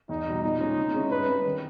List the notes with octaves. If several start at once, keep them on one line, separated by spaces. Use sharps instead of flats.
E2 D#4
B2 G3
A#2 D#4
G#3 C#4 G#4
C#3
G#3 C#4 E4
G2 B4
G3 C#4
D#3